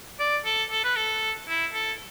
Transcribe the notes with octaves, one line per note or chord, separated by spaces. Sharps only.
D5
A4
A4
B4
A4
E4
A4